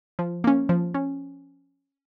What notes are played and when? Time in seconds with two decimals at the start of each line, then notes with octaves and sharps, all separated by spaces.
0.19 F3
0.44 A#3 C#4
0.69 F3
0.94 C#4